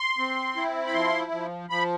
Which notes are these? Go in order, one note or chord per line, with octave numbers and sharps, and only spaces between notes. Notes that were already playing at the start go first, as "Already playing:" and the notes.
Already playing: C6
C4
E4
B5
F3 C6
F3
F3 B5